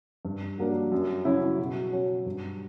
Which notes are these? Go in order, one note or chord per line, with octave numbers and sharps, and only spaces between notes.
G2
F#3 A#3 D4
F#2
C#3 F#3 C#4 E4
B2
F#3 C#4
G2